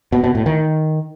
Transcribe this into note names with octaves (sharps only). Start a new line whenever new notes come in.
B2
B2
A2
D#3